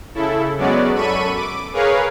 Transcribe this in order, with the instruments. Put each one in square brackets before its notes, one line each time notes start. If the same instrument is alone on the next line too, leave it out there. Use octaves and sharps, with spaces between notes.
[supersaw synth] C#3 E4 A4
F#3 G#3 B3 C#4 F#4 D5
F#2 A4 B5 C#6 D#7
D6
G#4 A#4 B4 C#5 F5